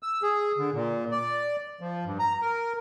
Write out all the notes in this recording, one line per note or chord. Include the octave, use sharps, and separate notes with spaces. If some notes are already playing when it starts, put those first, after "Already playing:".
E6
G#4
D3
A#2
D5
F3
G2
A#5
A#4